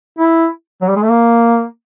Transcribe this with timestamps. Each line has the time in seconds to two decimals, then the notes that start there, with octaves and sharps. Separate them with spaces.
0.19 E4
0.81 F#3
0.89 G3
0.96 G#3
1.03 A3
1.10 A#3